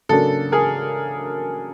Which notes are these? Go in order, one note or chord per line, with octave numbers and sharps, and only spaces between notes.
C#3 F#3 A#3 D4 A4
G#4 A#4